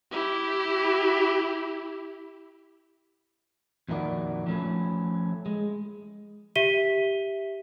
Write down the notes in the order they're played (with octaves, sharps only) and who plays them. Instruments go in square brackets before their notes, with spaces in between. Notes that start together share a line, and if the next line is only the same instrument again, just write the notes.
[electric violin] E4 G4
[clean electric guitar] F2 A#2 D#3 E4 F#4 D5
F3 A3 C#4 E4
G#3
[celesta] G4 E5 B6 D#7 G7